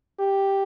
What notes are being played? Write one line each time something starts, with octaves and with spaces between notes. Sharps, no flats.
G4